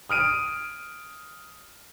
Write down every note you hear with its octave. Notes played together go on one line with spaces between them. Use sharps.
D#6 F6 D7 D#7